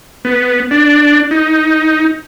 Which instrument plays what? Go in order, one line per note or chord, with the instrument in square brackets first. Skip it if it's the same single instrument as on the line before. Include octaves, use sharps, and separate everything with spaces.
[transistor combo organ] B3
D4
D#4